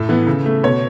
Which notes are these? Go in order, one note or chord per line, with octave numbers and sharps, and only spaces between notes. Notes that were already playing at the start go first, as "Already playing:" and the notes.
Already playing: A2 A4
E3 B3
C#3
A3
B2 C#5